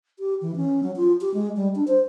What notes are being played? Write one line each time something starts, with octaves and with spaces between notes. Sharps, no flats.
G4
E3
C#4
F#3
F4
G4
G#3
G3
D4
C5